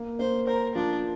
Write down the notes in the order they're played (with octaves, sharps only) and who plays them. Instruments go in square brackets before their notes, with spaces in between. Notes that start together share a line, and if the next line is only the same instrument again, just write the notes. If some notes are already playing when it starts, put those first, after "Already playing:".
Already playing: [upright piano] A#3
[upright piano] A#3 [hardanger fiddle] C5
[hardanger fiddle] A#4 [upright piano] C5
[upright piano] F3 [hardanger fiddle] D4